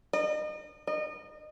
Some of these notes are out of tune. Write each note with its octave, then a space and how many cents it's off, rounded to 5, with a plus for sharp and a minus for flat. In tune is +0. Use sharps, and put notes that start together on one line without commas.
D#5 -35
D#5 -30